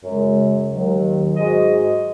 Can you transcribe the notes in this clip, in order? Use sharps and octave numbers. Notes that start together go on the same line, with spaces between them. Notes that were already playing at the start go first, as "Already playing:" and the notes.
F#2 C#3 G#3
D#2 D#3 F#3
G#2 G#3 F#4 D#5